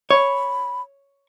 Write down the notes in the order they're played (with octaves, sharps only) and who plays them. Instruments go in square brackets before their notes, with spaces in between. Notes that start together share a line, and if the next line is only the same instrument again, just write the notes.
[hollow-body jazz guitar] C#5 [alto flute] B5